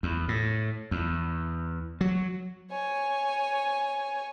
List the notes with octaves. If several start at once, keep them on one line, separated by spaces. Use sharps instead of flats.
E2
A2
E2
F#3
C#5 G#5